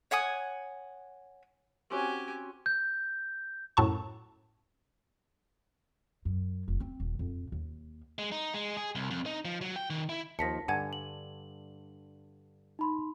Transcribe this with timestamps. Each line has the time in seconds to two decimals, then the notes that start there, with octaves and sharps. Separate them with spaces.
0.11 C#5 F#5 G#5 D#6
1.90 C4 C#4 F#4 G4 G#5
2.66 G6
3.77 F#2 A2 A5 C#6
6.25 F#2
6.68 F1
6.80 C4
7.00 D#1
7.19 F2
7.52 D#2
8.19 G#3
8.32 D#4
8.54 G#3
8.77 G#4
8.95 C2
9.11 F2
9.26 D#4
9.45 F3
9.61 F#3
9.76 G5
9.90 D#3
10.09 E4
10.39 D#2 F3 A5 A#6 B6 C#7
10.68 G2 D3 F#5 G#5 G#6
10.93 F#7
12.79 D#4 B5 C6